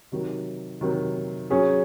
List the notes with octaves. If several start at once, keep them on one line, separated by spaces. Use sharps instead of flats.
C3 D#3 F#3
C3 D#3 F#3
F#3 C#4 G#4